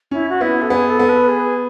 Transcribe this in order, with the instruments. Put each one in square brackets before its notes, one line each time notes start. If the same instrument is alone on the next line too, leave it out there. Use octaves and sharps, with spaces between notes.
[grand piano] C#4 [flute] E4
[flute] F#4
[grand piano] B3 [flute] E4
[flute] A4
[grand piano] B3 [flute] G#4
[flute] A4
[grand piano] B3
[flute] B4
G#4